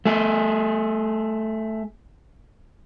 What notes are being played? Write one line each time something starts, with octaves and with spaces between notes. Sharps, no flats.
A3 G#4